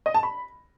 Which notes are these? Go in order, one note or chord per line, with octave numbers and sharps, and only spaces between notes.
D#5
A5
B5